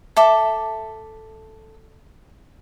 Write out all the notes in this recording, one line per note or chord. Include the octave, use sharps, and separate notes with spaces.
A4 E5 D6